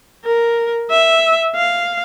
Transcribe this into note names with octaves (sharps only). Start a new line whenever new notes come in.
A#4
E5
F5